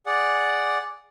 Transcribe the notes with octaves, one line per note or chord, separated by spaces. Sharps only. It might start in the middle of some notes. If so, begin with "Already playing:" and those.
G#4 D5 F#5